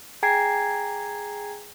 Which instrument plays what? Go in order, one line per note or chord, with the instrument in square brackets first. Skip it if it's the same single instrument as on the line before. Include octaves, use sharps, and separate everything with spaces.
[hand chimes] G#4 G5 G#5 A#5 G#6 C7